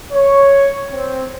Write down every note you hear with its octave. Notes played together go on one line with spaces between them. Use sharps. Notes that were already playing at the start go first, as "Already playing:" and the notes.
C#5
C4